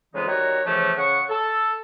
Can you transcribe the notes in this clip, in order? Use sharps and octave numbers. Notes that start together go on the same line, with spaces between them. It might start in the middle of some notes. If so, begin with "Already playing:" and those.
F2 C#3 E3 G#3 B3 D#4
D#3 G3 F#4 C#5 F#5 A#5
A2 C#3 E3 F3 A3 C#4
C#3 F#5 C#6
A4